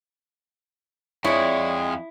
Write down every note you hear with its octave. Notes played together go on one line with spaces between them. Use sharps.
F2 G#3 E4 G#4 C#5 D5